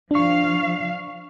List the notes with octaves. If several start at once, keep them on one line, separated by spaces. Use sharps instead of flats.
F3 D4 F5 C#6